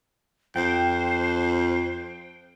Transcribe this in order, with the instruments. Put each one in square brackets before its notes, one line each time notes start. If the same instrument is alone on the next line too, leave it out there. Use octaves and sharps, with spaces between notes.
[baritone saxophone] F2 [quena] C5 [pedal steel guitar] G5